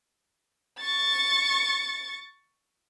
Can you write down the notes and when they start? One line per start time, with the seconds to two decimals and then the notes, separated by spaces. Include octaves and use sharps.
0.80 C#6 A6